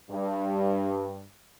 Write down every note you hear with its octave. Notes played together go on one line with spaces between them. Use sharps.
G2